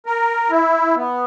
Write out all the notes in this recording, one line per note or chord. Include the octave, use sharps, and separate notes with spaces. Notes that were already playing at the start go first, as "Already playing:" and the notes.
A#4
E4
B3